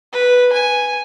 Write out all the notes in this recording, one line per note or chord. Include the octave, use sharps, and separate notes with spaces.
B4
G#5